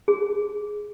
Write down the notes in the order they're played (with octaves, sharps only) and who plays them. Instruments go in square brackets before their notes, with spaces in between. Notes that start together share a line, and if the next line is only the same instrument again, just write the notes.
[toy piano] G#4